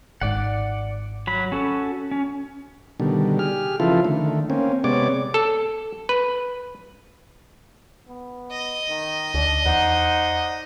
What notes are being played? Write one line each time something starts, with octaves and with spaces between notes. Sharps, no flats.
G#1 G#2 D5 F#5
F#3 B5
C#4 F#4 A4
C#4
B2 D3 D#3 G3
G4 G#4 F6
C#3 E3 F3 E4 F4 A4
D3 D#3 A3
A#3 C4 C#4
C3 G#3 B3 C#5 D5 D6
A4
B4
B3
D#5
D#3
D2 D4
E2 D#4 C5 D5 F#5